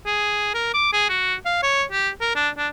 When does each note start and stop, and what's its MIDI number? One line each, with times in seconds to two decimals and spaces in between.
0.06 0.53 68
0.54 0.73 70
0.74 0.93 86
0.93 1.06 68
1.09 1.34 66
1.45 1.61 77
1.63 1.83 73
1.92 2.09 67
2.21 2.33 70
2.35 2.49 62
2.58 2.68 62